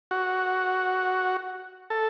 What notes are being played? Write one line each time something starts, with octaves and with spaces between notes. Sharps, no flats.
F#4
A4